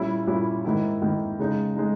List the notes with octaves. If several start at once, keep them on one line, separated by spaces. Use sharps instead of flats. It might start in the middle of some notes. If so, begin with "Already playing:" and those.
Already playing: A#2 G3 C#4 E4
A#2 G3 C#4 E4
G#2 D#3 A#3 E4
G#2 D#3 A#3 E4
C#3 G#3 D#4
G#3 D#4